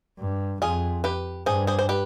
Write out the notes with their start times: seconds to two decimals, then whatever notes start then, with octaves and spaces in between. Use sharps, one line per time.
0.19 G2
0.61 F2 F4 G#4
1.04 G4 B4
1.46 G2 G#4 C5
1.67 G#4 C5
1.79 C5
1.89 G4 B4